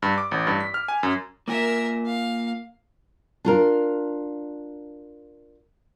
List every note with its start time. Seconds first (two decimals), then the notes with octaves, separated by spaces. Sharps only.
0.02 G2
0.18 D6
0.31 A1
0.47 G2
0.60 B6
0.74 F6
0.88 G#5
1.03 F#2
1.48 A#3 F4 A#4 E5 G#5
2.05 F5
3.45 D4 F4 A#4